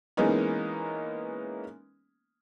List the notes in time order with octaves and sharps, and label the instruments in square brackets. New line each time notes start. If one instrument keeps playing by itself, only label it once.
[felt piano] E3 G#3 A#3 B3 C#4 D#4